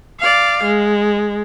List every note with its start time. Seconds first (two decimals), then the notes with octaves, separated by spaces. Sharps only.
0.20 D5 F5
0.64 G#3